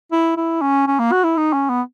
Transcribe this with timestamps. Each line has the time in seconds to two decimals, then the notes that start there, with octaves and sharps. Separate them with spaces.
0.12 E4
0.37 E4
0.62 C#4
0.87 C#4
0.99 A#3
1.12 F#4
1.24 E4
1.37 D#4
1.53 C#4
1.70 B3